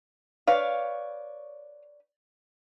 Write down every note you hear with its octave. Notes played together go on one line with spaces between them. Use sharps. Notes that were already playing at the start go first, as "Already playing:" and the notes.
B4 C#5 D5 F5